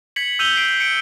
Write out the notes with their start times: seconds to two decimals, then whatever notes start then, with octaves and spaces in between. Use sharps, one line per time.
0.16 G#6 B6 C#7 F#7
0.39 E6 G6 D#7 F7 G7
0.56 B6 C7 D7
0.80 C#7 D7